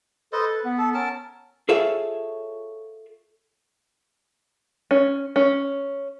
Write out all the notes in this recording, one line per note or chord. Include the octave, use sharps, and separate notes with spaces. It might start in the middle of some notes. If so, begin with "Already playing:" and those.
A4 B4 C5 D#5
B4
B3
A4
C#4 A#4 A5
F4 G#4 A4 C#5 E5 F5
C#4
C#4